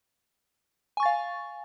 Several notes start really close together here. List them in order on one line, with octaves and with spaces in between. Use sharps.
G#5 C#6 A6 F5